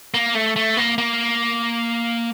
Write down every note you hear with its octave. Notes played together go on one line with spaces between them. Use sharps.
A#3
A3
A3
A#3
A#3